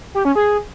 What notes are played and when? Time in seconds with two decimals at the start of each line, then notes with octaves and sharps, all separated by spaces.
0.15 G4
0.25 C#4
0.36 G#4